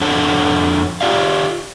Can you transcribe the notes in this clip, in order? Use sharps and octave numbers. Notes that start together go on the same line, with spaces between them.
F2 D4 A4 C#5 F#5 A5
F4 G4 D5 F5